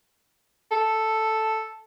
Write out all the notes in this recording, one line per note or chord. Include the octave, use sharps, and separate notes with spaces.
A4